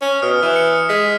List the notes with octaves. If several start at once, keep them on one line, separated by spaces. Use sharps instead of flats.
C#4
B2 D#6 F6
E3
C#7
G#3 B6